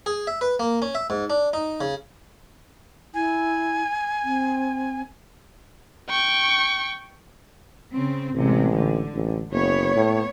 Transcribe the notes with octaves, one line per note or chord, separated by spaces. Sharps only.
G#4
E5
B4
A#3
C#4
E5
G#2
D4
D#4
C#3
E4 G#5
C4
G5 C#6
C#3 C4
A1 C3 G#3
D3
A1
F#1 B3 C#5
A2